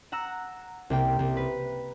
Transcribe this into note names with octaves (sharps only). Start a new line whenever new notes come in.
F#5 A#5 E6 F#6
C2 A#3 G5
C2
B4